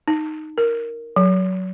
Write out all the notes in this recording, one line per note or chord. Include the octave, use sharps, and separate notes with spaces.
D#4
A#4
F#3